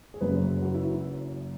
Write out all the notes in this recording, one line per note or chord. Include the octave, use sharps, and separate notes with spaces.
G#4
F#1 F#2 F#3 B4
F#4
E4